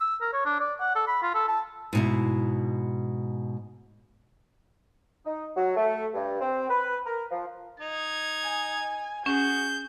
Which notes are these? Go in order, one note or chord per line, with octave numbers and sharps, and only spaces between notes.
E6
A#4
C#5
D4
D5
F#5
A4
B5
F4
A4
A5
G#2 B2 E4
D#4
F#3
A3
G2
C4
B4
A#4
F3
D#4 G#6
G#5
C#4 F#4 G#4 G6